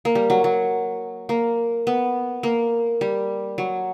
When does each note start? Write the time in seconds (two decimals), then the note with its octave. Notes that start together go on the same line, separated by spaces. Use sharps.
0.05 A#3
0.15 G3
0.30 F#3
0.44 F#3
1.29 A#3
1.87 B3
2.43 A#3
3.01 G3
3.58 F#3